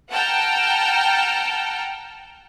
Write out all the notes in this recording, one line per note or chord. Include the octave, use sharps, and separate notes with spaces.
F#5 G5 A5 A#5 F6